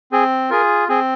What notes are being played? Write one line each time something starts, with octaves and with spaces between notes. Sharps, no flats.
C4 G#4
F4 G#4 A#4
C4 G#4